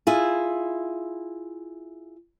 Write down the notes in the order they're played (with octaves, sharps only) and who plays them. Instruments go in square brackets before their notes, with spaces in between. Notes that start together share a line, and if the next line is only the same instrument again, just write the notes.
[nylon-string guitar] E4 F4 G#4